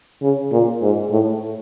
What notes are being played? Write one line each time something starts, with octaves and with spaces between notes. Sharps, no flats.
C#3
A#2
G#2
A2